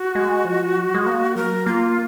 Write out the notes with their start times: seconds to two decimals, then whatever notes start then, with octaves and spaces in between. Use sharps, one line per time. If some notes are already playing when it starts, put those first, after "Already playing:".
Already playing: F#4
0.15 G#3
0.45 F3
0.76 F#3
0.94 G#3
1.06 A#3
1.36 F#3 A#4
1.66 A#3 F4